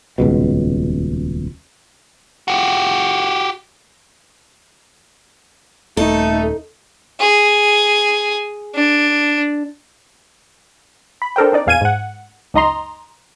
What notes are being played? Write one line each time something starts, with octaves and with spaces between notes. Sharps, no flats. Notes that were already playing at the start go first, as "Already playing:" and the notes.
D#1 C#2 B2
F#4 G4
D#1 A3 D#4 A4
G#4
D4
B5
D4 A4 A#4 C5 G5
C4 D4 D#4 D5
A#1 E2 F5 G#5 G#6 D#7
G#2 F#5
C#2 F#2 D#4 D#5 A#5 C6